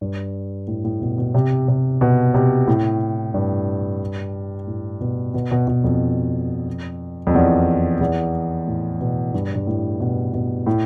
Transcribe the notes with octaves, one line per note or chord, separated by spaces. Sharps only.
G2
A2
A2
B2
B2
C3
C3
B2
C3
A2
G2
A2
B2
B2
B2
B2
F2
F2
E2
E2
A2
B2
G2
G2
A2
B2
B2
A2